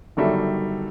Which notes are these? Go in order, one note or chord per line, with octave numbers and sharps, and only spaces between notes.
G1 D#3 F#3 G3 A4 E5